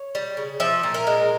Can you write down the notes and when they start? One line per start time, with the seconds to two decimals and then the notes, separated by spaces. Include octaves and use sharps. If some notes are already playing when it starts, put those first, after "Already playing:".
Already playing: C#5
0.15 G3
0.37 C#3
0.60 F3 E5
0.83 A#2
0.94 A#4
1.07 G#3